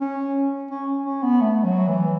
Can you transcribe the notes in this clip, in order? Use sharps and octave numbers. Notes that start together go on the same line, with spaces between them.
C#4
C#4
C#4
B3
A3
F#3
E3